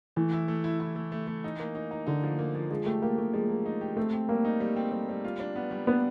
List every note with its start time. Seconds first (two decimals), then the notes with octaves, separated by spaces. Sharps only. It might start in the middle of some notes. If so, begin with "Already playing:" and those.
0.16 E3 A3
0.33 E4
0.48 A3
0.64 E4
0.80 E4
0.96 A3
1.12 A3
1.27 A3
1.44 D#4
1.59 A#3
1.75 D#4
1.91 D#4
2.07 D3 D#4
2.23 F3
2.39 A#3
2.55 F3
2.70 F3 G#3
2.86 A3 G4
3.02 A#3 G4
3.18 A3 G4
3.33 F3 G#3
3.49 A#3
3.66 D#4
3.81 G4
3.97 A3 C4
4.13 C4
4.29 G3 A#3
4.45 D#4
4.60 G3
4.76 C4
4.92 G3
5.09 G3
5.25 F4
5.40 D4
5.56 B3
5.71 G3
5.87 B3 D4